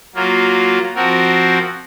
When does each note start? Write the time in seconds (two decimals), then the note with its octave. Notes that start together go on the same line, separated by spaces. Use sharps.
0.15 F#3 A#3 F4
0.95 F3 C4 F#4 A#4